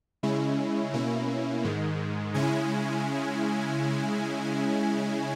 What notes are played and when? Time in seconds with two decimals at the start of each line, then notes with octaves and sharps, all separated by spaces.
0.23 C#3 G#3 C#4 E4
0.93 B2 A#3 C#4 E4
1.64 G#2 D#3 G#3
2.34 C#3 G#3 C#4 E4 G#5